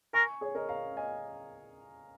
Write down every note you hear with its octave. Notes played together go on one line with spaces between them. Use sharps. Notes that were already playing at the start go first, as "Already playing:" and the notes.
A#4 G#5 C#6
G#4 C#5
A#4 D#5
F5 A#5
D#5 G#5